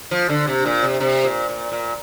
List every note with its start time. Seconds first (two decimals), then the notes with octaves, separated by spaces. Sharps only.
0.11 F3
0.29 D3
0.47 C3
0.66 A#2
0.82 C3
1.00 C3
1.24 A#2
1.49 A#2
1.72 A#2